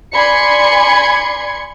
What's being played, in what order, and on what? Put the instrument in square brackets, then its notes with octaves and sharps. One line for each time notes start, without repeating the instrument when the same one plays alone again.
[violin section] D5 G#5 B5 C6 G#6 C#7